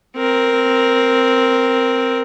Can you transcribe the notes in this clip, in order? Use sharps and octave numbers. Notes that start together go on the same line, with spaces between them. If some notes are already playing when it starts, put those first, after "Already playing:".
C4 A#4